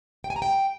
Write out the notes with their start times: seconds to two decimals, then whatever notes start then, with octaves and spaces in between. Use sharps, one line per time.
0.24 G5
0.30 G#5
0.36 A#5
0.42 G5